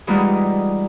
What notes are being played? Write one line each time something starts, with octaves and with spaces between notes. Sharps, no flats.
E3 G3 G#3 B3 D#4 F4